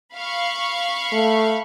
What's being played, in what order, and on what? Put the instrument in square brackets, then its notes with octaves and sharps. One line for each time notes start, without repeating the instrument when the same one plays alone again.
[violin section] F5 B5 C#6
[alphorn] A3